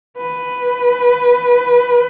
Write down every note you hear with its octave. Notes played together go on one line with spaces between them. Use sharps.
B4